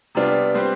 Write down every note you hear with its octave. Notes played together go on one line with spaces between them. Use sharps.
C3 G3 B3 D4 F4
G3 C4 G4 B4